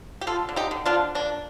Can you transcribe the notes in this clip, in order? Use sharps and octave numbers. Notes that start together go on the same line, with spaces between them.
G4
D3 F4 A4
D3
D#4 G4
D3
D4 F4
F3
A#3 D4